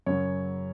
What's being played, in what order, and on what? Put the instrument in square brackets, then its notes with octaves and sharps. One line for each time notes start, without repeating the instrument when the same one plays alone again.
[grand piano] F#2 C#3 F#3 C#5